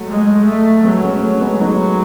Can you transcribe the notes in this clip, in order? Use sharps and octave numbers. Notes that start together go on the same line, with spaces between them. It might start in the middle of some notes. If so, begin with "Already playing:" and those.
Already playing: F#3 A3
G#3
A3
F#3 G#3 B3
A3 C#4
A3 C#4
G#3 B3
F#3 B3 D#4